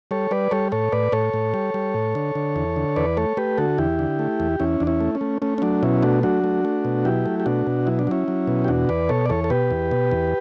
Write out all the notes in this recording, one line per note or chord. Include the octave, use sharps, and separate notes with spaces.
G3 A4 C#5
G3 B4 D5
G3 A4 C#5
A2 A4 C#5
A2 B4 D5
A2 A4 C#5
A2
G3
G3
A2
D3
D3
E2
D3
E2 B4 D5
A3 A4 C#5
A3 G4 B4
D3 F#4 A4
E2 E4 G4
D3
A3
E2
E2 C#4 E4
E2 D4
C#4 E4
A3
C#4
A3
A3 C#4
C#4
F#3 D4
B2 C#4 E4
A3 D4 F#4
F#3 D4 F#4
A3
A3
B2
F#3 E4 G4
A3
G4
B2 D4 F#4
B2
F#3 E4
D4
F#3 C#4 E4
F#3
B2
G4
E2 D4 F#4
E2 B4 D5
B2 A4 C#5
D5
E2 A4 C#5
A4
B2 G4 B4
E2
B2
E2